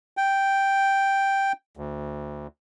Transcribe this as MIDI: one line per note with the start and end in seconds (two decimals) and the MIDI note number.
0.17 1.52 79
1.77 2.47 38